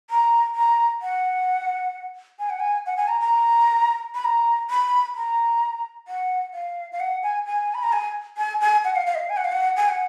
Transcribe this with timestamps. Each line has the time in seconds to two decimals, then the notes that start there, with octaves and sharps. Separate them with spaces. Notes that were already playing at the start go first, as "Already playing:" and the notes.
0.10 A#5
0.55 A#5
1.02 F#5
2.39 G#5
2.50 F#5
2.60 G#5
2.86 F#5
2.97 G#5
3.08 A#5
3.21 A#5
4.15 B5
4.24 A#5
4.70 B5
5.16 A#5
6.08 F#5
6.54 F5
6.92 F5
7.00 F#5
7.23 G#5
7.46 G#5
7.74 B5
7.83 A#5
7.93 G#5
8.37 G#5
8.61 G#5
8.84 F#5
8.96 F5
9.06 F5
9.15 D#5
9.18 F5
9.29 G#5
9.37 F#5
9.45 F5
9.52 F#5
9.77 G#5
9.89 F#5